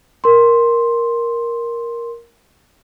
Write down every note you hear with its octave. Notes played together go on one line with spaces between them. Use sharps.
A#4 C6